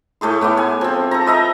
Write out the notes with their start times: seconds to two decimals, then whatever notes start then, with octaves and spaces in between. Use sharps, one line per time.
0.21 A2 A3 G#4 C6
0.41 A2 B3 G#5 D6
0.57 G#5
0.81 F3 C4
1.11 A4 A#5
1.26 B4 D#5 E5 A#5